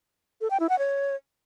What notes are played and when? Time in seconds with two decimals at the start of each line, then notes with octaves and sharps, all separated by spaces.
0.41 A4
0.51 G5
0.60 E4
0.69 F#5
0.79 C#5